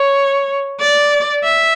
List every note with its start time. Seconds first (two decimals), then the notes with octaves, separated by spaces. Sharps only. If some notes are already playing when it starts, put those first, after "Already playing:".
Already playing: C#5
0.80 D5
1.44 E5